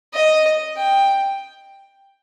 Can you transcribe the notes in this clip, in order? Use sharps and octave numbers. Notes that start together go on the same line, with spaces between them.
D#5
G5